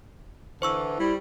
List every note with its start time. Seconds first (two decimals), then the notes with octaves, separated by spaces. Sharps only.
0.62 D3 E3 C5 C#6 E6
0.99 G3 E4